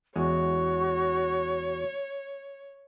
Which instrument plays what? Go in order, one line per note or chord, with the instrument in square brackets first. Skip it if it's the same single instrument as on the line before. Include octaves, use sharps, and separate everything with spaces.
[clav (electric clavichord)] E2 G#3 [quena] F#4 [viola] C#5